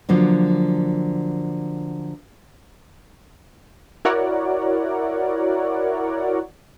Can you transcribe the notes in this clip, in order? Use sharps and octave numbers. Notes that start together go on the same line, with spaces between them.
D3 F3 F#3 A#3
E4 F#4 A#4 C#5 D5 F#5